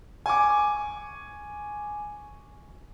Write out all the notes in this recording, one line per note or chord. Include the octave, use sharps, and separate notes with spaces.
G#5 C#6 D6